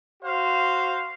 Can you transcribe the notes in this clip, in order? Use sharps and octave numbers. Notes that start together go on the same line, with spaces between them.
F#4 C5 F5